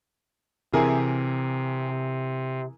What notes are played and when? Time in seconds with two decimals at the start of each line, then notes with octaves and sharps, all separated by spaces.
0.73 C3 E3 C4 G#4 A#4